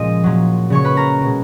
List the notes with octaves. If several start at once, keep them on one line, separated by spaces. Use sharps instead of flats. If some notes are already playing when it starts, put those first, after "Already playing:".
Already playing: A#2 C#3 F3 G#3 D#5 D#6
A#2 F#3
C#3 F#3 C#5 C#6
B4 B5
A#4 A#5
B2 G#3